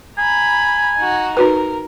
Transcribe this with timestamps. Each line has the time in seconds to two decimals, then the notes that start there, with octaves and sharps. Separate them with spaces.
0.18 G#5 A#5 B5
0.98 D#4 F#4
1.37 D#4 F#4 A#4 B4